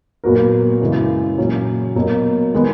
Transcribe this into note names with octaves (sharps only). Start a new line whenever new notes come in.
A#2 F#3 B3 F#4 A#4
F#2 C#3 E3 G#3
A#2 F#3 C#4
B2 F#3 A#3
D#3 G#3 B3